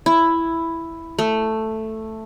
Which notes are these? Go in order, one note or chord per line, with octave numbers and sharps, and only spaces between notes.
E4
A3